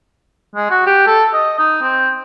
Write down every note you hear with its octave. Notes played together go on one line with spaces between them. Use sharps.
G#3
F#4
G4
A4
D#5
D#4
C4